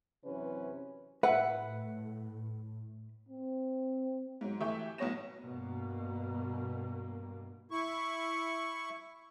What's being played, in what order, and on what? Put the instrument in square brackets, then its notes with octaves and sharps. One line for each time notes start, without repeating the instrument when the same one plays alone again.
[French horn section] F#2 C3 E3 C#4 B4
[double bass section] A2 [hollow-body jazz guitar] B4 [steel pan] E5 [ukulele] F#5
[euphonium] C4
[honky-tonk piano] G#2 F#3
E3 A3 G4 E5 C#6 G6
B1 A2 B3 C#5 A#6 E7
[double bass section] G2 B2 A#3
[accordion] E4 C#6